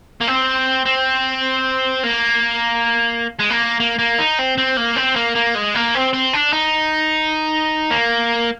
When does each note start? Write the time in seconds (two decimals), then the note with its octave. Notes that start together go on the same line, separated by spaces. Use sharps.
0.21 A#3
0.27 C4
0.86 C4
2.04 A#3
3.39 G#3
3.50 A#3
3.80 A#3
3.99 A#3
4.18 D#4
4.39 C4
4.58 C4
4.77 A#3
4.97 C4
5.16 A#3
5.36 A#3
5.56 G#3
5.75 A#3
5.95 C4
6.14 C4
6.34 D4
6.53 D#4
7.91 A#3